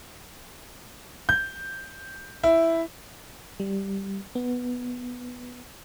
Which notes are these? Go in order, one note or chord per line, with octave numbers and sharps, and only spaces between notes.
G6
E4
G3
B3